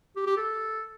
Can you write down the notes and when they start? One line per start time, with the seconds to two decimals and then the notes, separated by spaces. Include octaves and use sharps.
0.16 G4
0.26 G4
0.37 A4